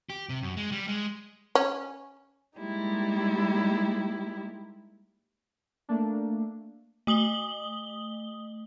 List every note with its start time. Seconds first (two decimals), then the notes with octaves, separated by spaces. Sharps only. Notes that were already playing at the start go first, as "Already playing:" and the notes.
0.10 G4
0.29 C3
0.43 F#2
0.57 G#3
0.72 G3
0.88 G#3
1.55 C#4
2.59 G3 G#3 A#3 D#4 E4 G4
5.89 A3 A#3 D4
7.07 A3 D#6 F#7 G7